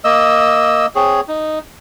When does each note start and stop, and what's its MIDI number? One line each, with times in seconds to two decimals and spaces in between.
0.04 0.86 58
0.04 0.86 75
0.04 0.86 88
0.95 1.21 60
0.95 1.21 68
0.95 1.21 73
1.28 1.59 63